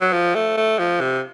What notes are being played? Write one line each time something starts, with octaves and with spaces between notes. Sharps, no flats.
F#3
F3
A3
A3
F3
C3